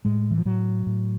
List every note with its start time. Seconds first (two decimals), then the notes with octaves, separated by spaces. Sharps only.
0.05 A2 G#3
0.31 E3
0.38 F3
0.45 A2 F#3
0.86 A2